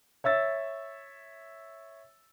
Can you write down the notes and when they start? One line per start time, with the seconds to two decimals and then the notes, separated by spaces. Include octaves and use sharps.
0.24 C#5 E5 E6 A6